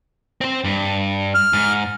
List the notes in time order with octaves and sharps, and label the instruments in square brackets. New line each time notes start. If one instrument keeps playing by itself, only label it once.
[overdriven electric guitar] C4 C5
G2
[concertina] F6
[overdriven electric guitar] G#2